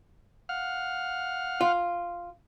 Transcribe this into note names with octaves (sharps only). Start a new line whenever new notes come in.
F5 F#5 F6
F4